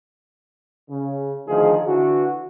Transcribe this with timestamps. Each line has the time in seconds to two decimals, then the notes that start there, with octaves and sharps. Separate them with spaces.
0.90 C#3
1.48 D2 D#3 F3 D#4 G#4
1.87 D3 E3 F#4